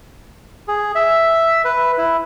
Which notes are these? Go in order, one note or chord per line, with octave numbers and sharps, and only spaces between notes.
G#4
E5
B4
E4